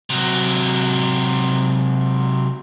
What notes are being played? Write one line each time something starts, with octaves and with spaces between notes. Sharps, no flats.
C3 F#3